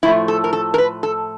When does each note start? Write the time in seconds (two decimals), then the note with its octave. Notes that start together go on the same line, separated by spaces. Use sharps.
0.03 A2 F3 A3 E4
0.28 A4
0.44 A#4
0.53 A4
0.74 A#4
0.78 B4
1.03 A4